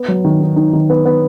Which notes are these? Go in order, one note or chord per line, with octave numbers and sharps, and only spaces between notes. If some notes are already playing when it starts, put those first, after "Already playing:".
Already playing: B3
F#3
D#3
D#4
D#4
D#3
B3
B3